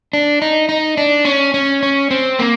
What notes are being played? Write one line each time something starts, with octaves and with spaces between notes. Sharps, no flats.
D4
D#4
D#4
D4
C#4
C#4
C#4
C4
A#3